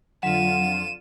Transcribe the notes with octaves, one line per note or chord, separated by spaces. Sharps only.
F2 D3 F#3 F4 D#7 E7